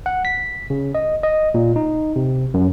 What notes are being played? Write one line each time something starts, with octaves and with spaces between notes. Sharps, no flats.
F#5
B6
C#3
D#5
D#5
A#2
D#4
C3
F#2